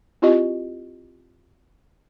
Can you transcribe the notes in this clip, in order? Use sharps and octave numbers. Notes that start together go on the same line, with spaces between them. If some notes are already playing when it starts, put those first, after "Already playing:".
C4 E4 F4 G4 D#5